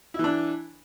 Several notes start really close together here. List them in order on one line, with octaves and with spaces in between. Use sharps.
E4 E3 D4